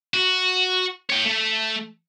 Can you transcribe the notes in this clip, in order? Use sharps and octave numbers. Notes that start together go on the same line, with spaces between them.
F#4
C#5 G5
A3